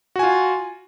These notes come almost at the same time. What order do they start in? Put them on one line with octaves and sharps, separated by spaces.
F#4 G#5 F4